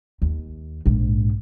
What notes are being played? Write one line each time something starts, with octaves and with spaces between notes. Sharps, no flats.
D#2
A#1 G#2